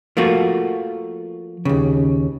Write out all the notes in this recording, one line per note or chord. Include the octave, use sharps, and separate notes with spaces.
F3 A3 A#3 F4 F#4
D#2 C#3